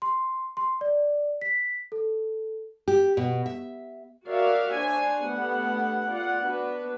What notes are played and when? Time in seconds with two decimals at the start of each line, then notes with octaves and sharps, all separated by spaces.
0.02 C6
0.57 C6
0.81 D5
1.41 B6
1.92 A4
2.88 G4
3.17 B2
3.46 E5
4.26 F#4 A#4 C#5 D5 E5 F5
4.74 D4 C5 C#5 G#5
5.19 A3 B3 D4 G4 F#5
6.09 F4 D5 F#5
6.41 B3 D4 F#4 B4